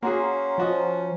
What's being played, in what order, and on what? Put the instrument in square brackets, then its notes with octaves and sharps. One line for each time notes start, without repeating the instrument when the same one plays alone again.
[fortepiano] A#3 F#4 G#4 [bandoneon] C#4 [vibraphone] F#5 A#5 C6
[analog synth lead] F3 [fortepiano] F4 F#4 D#5